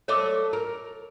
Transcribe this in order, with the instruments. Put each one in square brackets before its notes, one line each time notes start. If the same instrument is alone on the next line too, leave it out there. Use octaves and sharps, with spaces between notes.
[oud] A3 A4 D#5 [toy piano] C#5 D6 E6
[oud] A#4